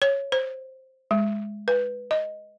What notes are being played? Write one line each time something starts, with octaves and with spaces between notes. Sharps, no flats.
C#5
C5
G#3
B4
D#5